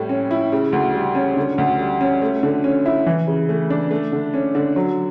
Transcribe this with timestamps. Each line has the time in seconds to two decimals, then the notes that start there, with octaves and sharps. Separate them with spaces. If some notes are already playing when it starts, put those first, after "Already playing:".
Already playing: A2 G3
0.09 C#4
0.31 E4
0.52 C#3
0.73 D2
0.95 G3
1.15 C#4
1.36 D3
1.58 D2
1.79 G3
2.01 C#4
2.22 A3
2.43 D3
2.64 C#4
2.86 E4
3.06 E3
3.27 C#3
3.49 A3
3.70 D4
3.91 A3
4.12 D3
4.34 C#4
4.55 D3
4.76 F#3